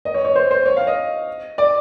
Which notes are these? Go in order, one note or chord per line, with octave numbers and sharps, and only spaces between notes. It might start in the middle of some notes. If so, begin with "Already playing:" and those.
D#5
C#5
C#5
C5
C5
C#5
F5
D#5
D5